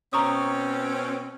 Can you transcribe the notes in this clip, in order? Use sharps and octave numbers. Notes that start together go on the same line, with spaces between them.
B2 C4 C#4 A#5 C#6 D#6